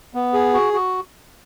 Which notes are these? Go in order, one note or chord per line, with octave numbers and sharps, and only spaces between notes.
B3
G#4
F#4
F#4